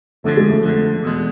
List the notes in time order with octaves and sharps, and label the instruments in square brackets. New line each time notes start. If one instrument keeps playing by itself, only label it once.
[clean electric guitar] F2 D3 F3 [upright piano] A3
[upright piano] G#3
A3
[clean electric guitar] F2 D3 F3
E2 B2 G#3